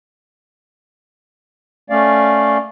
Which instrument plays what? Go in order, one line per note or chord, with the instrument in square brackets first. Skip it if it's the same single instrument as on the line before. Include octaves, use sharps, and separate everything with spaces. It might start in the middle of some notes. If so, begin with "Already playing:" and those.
[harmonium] A3 C#4 D5 F5